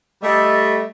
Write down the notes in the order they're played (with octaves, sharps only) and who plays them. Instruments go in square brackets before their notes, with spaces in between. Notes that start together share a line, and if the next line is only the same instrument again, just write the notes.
[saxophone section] G3 A3 [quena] D#5